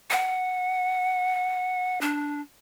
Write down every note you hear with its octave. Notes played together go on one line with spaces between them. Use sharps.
F#5
D4